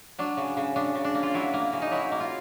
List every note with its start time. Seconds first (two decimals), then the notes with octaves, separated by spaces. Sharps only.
0.19 F#3 D4
0.37 C#3
0.57 C#3
0.76 C#3 D4
0.95 C#3
1.05 D4
1.15 A#3
1.23 F4
1.34 F#3 E4
1.54 A#3
1.73 C#3
1.82 D#4
1.91 F#3 E4
2.12 A#3
2.20 F4